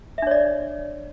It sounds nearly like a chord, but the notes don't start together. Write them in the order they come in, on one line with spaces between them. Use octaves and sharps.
E5 D4 C#5 D5